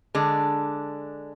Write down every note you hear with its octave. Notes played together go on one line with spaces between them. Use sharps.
D3 G#3 D4